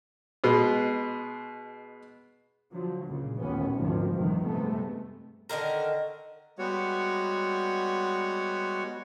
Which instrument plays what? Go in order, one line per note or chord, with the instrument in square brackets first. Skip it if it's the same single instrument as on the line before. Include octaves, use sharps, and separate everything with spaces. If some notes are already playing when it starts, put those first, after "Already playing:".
[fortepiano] B2 G#3
[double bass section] D3 F3 F#3
C#2 A#2 C#3
A1 D#2 A#2 B3 C#4
G#1 D2 D#3 F3
F1 C2 G2 C3 D#3 E3
G2 C3 G#3 A3 B3
[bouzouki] D3 D#3 A#3 A#4
[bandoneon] G3 G#3 B3 F#4 C#5